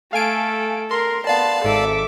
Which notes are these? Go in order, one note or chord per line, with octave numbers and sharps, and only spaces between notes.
A3 A4 F5 G#5 D7
A#4 C6
B3 D5 F5 A5
G#1 A4 E5 D6